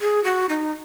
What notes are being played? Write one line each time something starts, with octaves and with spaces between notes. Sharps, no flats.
G#4
F#4
D#4